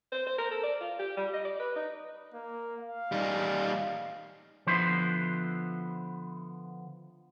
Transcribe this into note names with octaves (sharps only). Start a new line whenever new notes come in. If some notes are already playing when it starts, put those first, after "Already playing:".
C5
C5
A#4
A4
D5
F4
G4
G3
D#5
D5
B4
D#4
A#3
F5
G3 D#4
D3 F3 B3 E4 C5